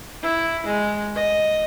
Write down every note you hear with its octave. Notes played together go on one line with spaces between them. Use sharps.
E4
G#3
D#5